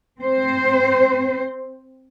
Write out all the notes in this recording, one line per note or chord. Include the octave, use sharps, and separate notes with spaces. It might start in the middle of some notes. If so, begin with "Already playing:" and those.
C4 C5